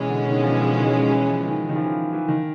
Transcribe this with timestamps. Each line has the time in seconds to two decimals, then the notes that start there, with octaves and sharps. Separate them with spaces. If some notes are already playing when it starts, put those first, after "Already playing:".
Already playing: B2 E3 G#3 C#4
0.09 D3
0.29 D#3
0.44 F3
0.50 E3
0.80 D#3
1.09 E3
1.29 F3
1.48 D#3
1.69 D#3
1.76 F3
1.83 E3
2.13 E3
2.28 D#3